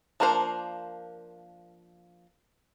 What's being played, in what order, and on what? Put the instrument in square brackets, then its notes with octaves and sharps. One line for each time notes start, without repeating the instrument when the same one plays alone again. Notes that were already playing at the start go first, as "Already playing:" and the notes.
[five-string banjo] F3 A#3 D4 A#4 C5